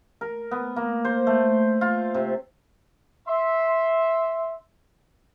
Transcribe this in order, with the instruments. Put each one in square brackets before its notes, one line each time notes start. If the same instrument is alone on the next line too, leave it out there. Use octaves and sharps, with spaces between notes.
[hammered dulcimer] A#4
B3
A#3
C5
A3
F4
C3
[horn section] E5 C6